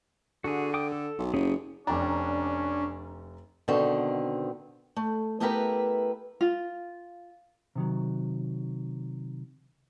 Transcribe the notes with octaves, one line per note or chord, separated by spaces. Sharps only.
D3 F#4 G#4
G5 D6 D#6
A4
B1
F#1 C#4 G4 G#4
F1 C#4 D4 G5 A#5
B2 D3 D#3 B3 C4
A3
A3 B3 E4 G4 A#4 B4
F4
C3 D#3 F#3